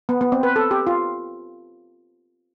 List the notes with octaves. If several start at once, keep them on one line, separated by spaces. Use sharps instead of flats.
B3
B3
C4
B4
A4
G4
F4